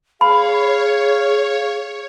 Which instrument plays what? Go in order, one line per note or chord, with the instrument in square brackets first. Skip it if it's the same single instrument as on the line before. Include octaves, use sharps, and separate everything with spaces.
[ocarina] G#4 [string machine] C#5 [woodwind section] F5 [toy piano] B5